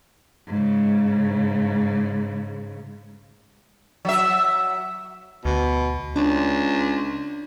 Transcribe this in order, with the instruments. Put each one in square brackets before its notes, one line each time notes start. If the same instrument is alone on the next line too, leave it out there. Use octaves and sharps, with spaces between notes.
[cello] G#2 C#3
[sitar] F#3 E5
[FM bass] D2 [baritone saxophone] B2
[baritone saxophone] C#2 [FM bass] D4